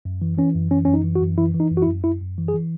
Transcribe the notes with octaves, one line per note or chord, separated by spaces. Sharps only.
F#2
E3
E3 C#4
F#2
E3 C#4
F#2 C#4
D#4
E3
F#4
F#2
E3 E4
E3
D#4
F#2
F#4
E4
F#2
F#2 E4
F#2
E3
G#4
E3